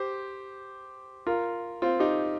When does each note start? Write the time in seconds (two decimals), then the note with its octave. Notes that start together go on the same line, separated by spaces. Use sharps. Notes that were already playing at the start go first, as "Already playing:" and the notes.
Already playing: G4 C5
1.27 F4 A#4
1.82 C4 F4
2.00 D#4 G4